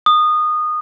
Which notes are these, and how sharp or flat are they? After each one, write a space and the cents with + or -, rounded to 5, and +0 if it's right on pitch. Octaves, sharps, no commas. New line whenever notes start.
D#6 -20